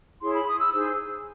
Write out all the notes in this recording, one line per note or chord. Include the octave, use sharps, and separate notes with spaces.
E4 G#4 C#5 C6
B5
D#6
E6
D#4 G#4 C5 E6